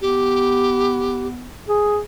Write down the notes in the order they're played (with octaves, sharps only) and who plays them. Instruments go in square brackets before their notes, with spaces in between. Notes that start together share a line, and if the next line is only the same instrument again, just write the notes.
[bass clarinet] B3 [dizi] G4
[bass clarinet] G#4